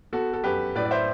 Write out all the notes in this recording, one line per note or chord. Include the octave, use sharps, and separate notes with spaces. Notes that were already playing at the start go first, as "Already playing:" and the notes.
B3 F#4 A4
A4
F#2 G4 B4
A2 B4 D5
D5
C5 E5